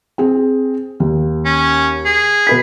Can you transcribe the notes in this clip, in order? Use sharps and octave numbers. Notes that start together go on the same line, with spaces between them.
C4 G#4
D#2
C#4
G#4
B2 B4 B6